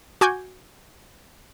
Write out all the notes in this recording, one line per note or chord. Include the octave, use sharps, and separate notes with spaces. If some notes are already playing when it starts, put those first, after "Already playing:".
F#4 G#5 D6 G6 G#6